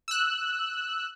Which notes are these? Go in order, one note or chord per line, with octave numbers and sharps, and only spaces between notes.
E6 F#6